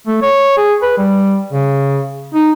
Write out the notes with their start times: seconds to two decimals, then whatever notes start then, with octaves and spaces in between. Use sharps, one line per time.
0.07 A3
0.22 C#5
0.57 G#4
0.82 B4
0.98 G3
1.53 C#3
2.34 D#4